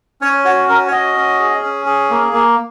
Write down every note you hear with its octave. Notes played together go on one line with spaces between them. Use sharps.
C#4 C#5
F#4 C#5
C#4 A#4
C#5
F#4 D#5
C#4
G#4
C#4
G#4
A#3
A#3